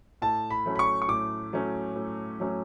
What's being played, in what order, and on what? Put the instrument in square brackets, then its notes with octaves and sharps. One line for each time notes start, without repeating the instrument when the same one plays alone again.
[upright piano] A2 [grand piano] A5
[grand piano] B5
[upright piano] F#3 A3 C#4
[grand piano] B5
C#6
C#6
[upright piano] A2 [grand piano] D6
[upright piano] F#3 A3 C#4
A2
F#3 A3 C#4